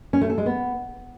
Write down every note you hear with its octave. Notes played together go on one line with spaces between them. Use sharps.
C#4
A3
A4
G#3
B3